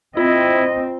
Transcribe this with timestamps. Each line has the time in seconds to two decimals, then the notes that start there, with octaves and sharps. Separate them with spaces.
0.17 C4 E4 F4 D#5